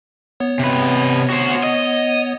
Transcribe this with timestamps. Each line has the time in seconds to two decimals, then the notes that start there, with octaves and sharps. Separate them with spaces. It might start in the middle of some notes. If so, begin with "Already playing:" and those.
0.40 B3 C#5
0.59 C3 B4
1.30 F#4 C5
1.63 D#5